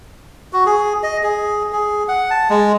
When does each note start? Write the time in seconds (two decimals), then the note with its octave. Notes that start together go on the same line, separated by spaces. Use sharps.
0.53 F#4
0.66 G#4
1.03 D#5
1.23 G#4
1.72 G#4
2.08 F#5
2.30 A5
2.50 G#3